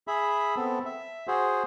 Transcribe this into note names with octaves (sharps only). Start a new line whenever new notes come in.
G#4 E5 B5
B3 C4 A4
E5
F#4 G#4 C5